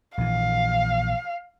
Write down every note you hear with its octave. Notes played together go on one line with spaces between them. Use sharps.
A#1 E3 F5